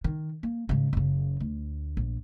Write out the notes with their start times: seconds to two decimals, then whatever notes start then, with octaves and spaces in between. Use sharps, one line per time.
0.04 D#3
0.43 A#3
0.69 G#2 C#3
0.93 F#1 C#3
1.40 D2
1.97 A#1